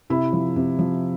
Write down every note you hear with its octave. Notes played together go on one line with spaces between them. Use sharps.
C3 E4
F3
C3
F3